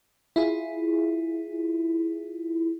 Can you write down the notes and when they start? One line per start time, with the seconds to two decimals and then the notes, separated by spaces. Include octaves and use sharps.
0.36 E4 F4 G#4